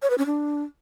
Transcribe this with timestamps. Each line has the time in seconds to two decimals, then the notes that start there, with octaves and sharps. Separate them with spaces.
0.02 C#5
0.10 B4
0.18 C#4
0.26 D4